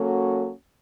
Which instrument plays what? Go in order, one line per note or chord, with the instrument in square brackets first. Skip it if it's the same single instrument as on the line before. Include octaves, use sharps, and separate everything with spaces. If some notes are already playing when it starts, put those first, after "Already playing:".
Already playing: [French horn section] F#3 A#3 C#4 F#4 A4